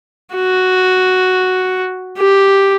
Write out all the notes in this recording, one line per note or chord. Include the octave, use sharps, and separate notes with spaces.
F#4
G4